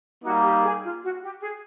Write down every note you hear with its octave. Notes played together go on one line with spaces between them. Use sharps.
G3 A#3 D#4 F#4
G4
G#4
F4
F#4
G4
G#4